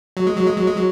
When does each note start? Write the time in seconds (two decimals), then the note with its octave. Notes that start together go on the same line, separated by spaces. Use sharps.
0.17 F#3
0.27 G#3
0.37 F#3
0.47 G#3
0.57 F#3
0.67 G#3
0.77 F#3